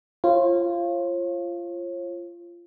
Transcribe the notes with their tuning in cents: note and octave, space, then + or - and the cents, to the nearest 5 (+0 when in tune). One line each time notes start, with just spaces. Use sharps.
F4 -20 C#5 -45